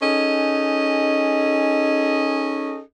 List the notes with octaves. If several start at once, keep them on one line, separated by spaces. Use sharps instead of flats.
C#4 D#4 G#4 A4 D#5